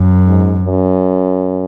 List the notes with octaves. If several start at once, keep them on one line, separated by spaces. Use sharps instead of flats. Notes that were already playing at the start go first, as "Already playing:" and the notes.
Already playing: F#2
G#2
F#2